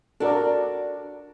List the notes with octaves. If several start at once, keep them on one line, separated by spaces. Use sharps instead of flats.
D4 F#4 A4 A#4 D5